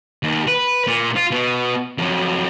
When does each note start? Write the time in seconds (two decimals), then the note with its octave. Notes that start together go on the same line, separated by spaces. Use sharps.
0.23 D#2
0.48 B4
0.87 A#2
1.16 F4
1.31 B2
1.98 F2 F#3